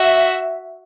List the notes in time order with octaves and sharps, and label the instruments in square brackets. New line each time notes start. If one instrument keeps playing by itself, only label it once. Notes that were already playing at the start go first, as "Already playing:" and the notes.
Already playing: [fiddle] F#4 [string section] E5